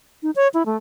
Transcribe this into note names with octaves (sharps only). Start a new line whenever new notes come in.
D#4
C#5
E4
A3